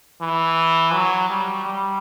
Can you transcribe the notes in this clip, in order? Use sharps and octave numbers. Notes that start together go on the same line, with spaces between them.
E3
F#3
G3
G3